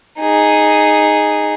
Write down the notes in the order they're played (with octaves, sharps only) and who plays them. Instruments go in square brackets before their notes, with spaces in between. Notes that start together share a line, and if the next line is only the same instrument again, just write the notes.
[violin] D#4 G#4